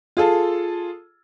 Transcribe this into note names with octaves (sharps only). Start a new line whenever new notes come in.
F4 G#4 A4